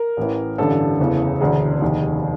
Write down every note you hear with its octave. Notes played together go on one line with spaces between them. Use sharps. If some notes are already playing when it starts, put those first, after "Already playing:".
Already playing: A#4
A1 A2 E3
A1 G2 D3 A4
F#1 E2 C#3 E3
E1 D2 D3 G#4
F1 D#2 D#3